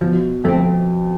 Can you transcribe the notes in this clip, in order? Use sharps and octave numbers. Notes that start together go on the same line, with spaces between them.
B2 F3
F2 A3 C4